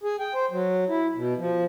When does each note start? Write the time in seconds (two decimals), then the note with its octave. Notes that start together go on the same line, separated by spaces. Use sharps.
0.03 G#4
0.20 G5
0.34 C5
0.51 F#3
0.89 E4
1.16 B2
1.38 F3